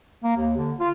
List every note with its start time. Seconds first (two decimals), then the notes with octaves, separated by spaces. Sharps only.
0.23 A#3
0.37 D#2
0.57 D3
0.80 F4